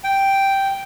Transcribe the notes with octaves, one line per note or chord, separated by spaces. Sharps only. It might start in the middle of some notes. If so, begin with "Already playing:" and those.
G5